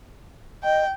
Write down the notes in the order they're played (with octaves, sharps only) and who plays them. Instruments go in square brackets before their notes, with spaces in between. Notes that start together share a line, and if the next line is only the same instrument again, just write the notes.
[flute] D#5 [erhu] G5